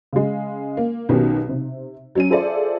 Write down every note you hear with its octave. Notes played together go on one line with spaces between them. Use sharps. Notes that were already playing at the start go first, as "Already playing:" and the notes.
C#3 G#3
A#3
B1 B2 D#3 C#4 G4
C3
F#3 C#4 D#7
F4 G#4 A4 C5 D5 E5